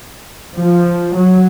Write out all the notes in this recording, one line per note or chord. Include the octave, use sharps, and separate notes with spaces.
F3
F#3